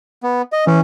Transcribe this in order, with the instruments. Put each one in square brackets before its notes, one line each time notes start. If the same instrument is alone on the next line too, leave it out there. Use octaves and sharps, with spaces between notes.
[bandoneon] B3
D#5
[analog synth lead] E3 [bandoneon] C#4